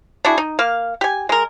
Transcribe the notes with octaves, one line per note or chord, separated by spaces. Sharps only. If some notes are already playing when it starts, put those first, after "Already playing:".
D4 E4 F#4 G#4
D#4
A#3 F5
G4 G#5
G#3 A#4